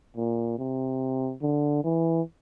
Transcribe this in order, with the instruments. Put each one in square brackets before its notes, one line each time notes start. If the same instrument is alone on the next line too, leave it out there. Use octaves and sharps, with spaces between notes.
[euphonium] A#2
C3
D3
E3